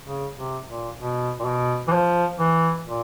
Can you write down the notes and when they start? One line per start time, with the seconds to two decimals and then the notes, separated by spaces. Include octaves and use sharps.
0.05 C#3
0.36 C3
0.68 A#2
0.99 B2
1.39 A#2
1.45 B2
1.88 E3
1.93 F3
2.39 E3
2.86 A#2